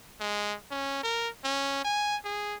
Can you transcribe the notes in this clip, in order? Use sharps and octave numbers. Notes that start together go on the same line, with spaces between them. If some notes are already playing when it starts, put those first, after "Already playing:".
G#3
C#4
A#4
C#4
G#5
G#4